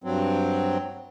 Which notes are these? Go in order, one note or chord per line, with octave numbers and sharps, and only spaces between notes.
G2 F#3 C4